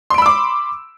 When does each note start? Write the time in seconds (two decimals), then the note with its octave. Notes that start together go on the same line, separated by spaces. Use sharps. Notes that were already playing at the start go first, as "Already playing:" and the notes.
0.10 C6
0.14 D7
0.18 B5
0.22 E6
0.26 D6